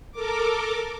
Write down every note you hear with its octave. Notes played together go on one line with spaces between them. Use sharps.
A4 A#4 D6